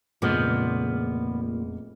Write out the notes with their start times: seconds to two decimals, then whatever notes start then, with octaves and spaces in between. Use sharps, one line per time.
0.22 F1 A#2 C#3 F3 G#3 B3 D6